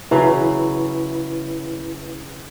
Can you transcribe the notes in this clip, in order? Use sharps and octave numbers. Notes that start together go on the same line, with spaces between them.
C#3 F#3 E4 B4